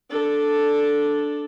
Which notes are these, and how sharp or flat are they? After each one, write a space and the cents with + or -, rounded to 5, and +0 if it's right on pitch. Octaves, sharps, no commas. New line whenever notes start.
D4 +0 A4 +0